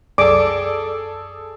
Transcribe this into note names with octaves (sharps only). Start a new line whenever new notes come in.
C2 F#2 G#4 A4 D5 D6